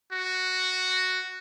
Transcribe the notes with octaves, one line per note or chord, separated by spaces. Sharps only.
F#4